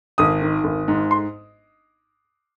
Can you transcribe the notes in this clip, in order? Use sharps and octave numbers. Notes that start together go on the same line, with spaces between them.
G#1 D#6
D#3
G#1
G#2
C6